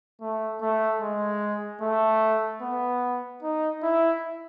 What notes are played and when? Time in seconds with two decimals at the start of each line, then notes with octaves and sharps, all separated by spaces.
0.21 A3
0.61 A3
1.01 G#3
1.81 A3
2.62 B3
3.42 D#4
3.82 E4